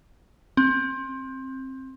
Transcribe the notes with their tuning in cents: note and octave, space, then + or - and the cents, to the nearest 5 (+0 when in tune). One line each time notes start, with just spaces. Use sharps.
C4 +20